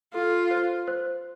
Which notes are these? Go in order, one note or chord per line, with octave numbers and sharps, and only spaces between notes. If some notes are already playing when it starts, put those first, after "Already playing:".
F4 A4
C5
C5